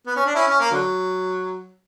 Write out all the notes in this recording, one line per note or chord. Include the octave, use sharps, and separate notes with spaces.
B3
C#4
D4
C#4 E4
C#4
A#3
D3 F#3